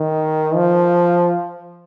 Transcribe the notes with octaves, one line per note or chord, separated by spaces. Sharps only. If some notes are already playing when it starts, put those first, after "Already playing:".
Already playing: D#3
F3